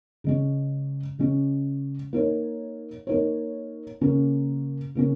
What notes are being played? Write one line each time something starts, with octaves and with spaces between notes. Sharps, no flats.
C#3 G#3 C#4
C#3 G#3 C#4
A#3 D#4 A#4 C#5
A#3 D#4 A#4 C#5
C#3 A#3 C#4
C#3 A#3 C#4